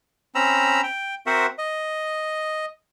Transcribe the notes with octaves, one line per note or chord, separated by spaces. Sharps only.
C4 C#4 A#5 B5 E6
G5
C4 F#4 A#4 C5 E5 F#5
D#5